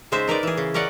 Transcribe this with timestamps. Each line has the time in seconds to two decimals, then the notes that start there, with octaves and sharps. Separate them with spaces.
0.12 C#3 G#3 D#4 C5 E5
0.27 D#4 A#4 B4 D5
0.43 E3 G#4
0.57 C#3
0.74 C#4 A#4 D5 D#5 F#5